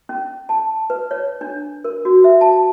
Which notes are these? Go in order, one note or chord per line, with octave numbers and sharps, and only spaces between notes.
C#4
A5
B4
C#5
D4
A#4
F#4
E5
A5